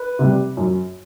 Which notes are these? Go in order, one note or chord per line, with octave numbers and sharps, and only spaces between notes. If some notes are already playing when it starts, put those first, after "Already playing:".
Already playing: B4
C3 G3
F#2